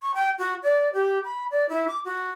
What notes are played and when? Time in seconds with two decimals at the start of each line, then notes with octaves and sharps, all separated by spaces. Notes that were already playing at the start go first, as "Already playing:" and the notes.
0.02 C#6
0.14 G5
0.39 F#4
0.63 D5
0.93 G4
1.25 B5
1.51 D5
1.69 E4
1.88 D6
2.05 F#4